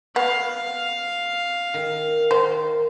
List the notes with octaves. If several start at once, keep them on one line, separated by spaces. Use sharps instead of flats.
B3 F5
D#3
D#3 C5